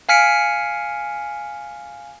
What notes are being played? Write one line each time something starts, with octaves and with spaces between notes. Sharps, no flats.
F5 G#5 F6 B6 C#7 D7